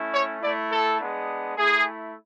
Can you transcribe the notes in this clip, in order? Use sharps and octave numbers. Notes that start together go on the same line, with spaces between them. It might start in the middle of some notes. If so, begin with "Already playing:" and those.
Already playing: A3 C#4 E4
C#5
A3 E4 D5
A4
G#3 B3 D4
A3 E4 G#4